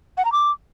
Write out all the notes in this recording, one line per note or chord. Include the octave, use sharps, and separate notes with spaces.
F#5
A#5
D6